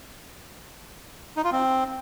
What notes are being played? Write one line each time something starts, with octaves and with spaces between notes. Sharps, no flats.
D#4
F4
C4